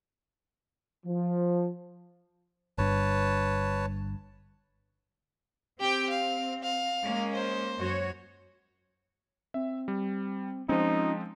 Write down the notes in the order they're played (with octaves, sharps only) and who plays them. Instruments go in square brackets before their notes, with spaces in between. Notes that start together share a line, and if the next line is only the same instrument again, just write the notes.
[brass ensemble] F3
[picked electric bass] G1 G2 [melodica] B4 C#5 A5
[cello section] C4 [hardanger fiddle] G4 G5
[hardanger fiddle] F5
F5
[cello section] G#3 A#3 C#4
[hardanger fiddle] C5
[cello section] F#2 F#4 C#5
[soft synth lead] C4 [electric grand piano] E5
[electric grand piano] G3
[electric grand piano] F3 G#3 C4 [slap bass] C#4 [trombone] D#4 [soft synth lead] F4